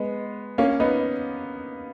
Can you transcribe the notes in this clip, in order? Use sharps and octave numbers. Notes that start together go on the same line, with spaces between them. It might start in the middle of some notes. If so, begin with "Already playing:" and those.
Already playing: G#3 B3
A#3 C#4
B3 D#4